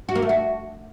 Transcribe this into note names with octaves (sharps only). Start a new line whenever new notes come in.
F#4
A#3
A3
F#4